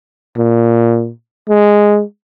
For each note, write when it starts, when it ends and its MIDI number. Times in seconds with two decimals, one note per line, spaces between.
0.38 1.11 46
1.49 2.03 56